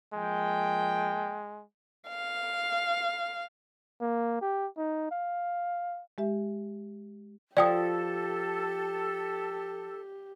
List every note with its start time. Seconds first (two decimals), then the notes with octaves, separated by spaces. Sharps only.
0.14 F3 G#3 A#3 G5
2.10 F5
4.01 A#3
4.41 G4
4.77 D#4
5.11 F5
6.18 G#3 G4 E5
7.57 F3 G4 A4 D5 G5 D#6